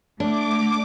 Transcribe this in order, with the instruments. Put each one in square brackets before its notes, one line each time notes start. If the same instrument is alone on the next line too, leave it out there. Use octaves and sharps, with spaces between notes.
[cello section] A3 [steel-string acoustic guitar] D4 [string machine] D6